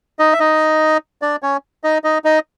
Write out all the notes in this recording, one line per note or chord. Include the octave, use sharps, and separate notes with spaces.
D#4 D#5
E5
D#4 D#5
D4 D5
C#4 C#5
D#4 D#5
D#4 D#5
D#4 D#5